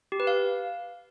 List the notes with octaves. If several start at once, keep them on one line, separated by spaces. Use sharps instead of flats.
G4
B4
F5